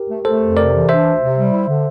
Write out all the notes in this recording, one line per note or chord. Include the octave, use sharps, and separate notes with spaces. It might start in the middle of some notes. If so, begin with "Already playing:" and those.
Already playing: G4 A#4
A3
A3 A4 C5
F2
C3 A#4 D5
E3
D4 C5 E5
D2
C3
G3
E4
D3